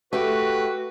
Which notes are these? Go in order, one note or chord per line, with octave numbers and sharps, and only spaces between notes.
A3 F#4 G4 B4